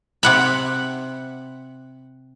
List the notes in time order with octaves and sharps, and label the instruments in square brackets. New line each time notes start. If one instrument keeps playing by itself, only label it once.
[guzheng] C3 F#5 B5